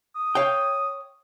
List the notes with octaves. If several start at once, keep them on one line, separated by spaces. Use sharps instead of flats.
D#6
C#5 F5 G5